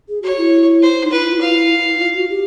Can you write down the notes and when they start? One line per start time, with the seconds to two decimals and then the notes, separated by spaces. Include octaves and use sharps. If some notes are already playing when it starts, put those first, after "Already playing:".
0.09 G#4
0.22 F#4 C#5
0.37 E4
0.82 C5
1.03 D#4
1.11 E4 B4
1.21 E4
1.31 F4
1.40 E4 F5
1.95 E4
2.00 F4
2.15 F#4
2.30 G4